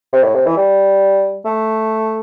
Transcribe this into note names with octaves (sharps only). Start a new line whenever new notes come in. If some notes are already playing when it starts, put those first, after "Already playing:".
C3
A2
C3
E3
G3
A3